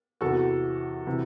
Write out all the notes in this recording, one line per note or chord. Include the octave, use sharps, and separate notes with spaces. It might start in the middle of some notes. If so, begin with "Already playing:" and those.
E2 C3 E3 F#4 A4
C3 E3